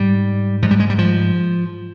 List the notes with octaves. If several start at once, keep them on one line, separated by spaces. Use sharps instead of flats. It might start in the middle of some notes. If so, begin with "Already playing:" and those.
Already playing: G#2 G3
G#2 F3
G3
G#3
G3
F3